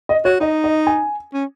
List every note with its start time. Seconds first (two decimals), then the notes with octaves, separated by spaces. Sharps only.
0.09 D#5
0.25 F#4 C#5
0.40 D#4 D#5
0.64 D#5
0.87 G#5
1.34 C#4